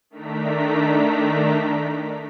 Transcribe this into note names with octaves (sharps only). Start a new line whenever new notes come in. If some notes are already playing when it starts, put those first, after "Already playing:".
D#3 A3 D4 A#5 B6